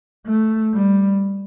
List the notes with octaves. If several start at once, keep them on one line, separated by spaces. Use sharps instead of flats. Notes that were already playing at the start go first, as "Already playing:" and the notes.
A3
G3